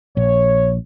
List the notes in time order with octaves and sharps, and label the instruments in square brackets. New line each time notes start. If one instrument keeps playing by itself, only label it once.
[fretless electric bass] A#1 [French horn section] C#5